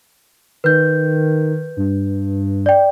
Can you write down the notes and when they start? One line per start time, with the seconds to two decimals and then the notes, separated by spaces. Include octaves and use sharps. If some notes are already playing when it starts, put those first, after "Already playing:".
0.64 D#3 B4 G6
1.77 G2
2.66 D5 G5